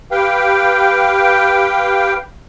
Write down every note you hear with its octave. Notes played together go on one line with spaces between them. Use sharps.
G4 B4 F5 G5